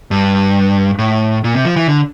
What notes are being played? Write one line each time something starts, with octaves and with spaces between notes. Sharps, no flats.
G2
A2
A#2
C3
F3
E3
D3